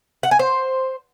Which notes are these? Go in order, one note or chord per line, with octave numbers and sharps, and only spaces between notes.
F#5
G#5
C5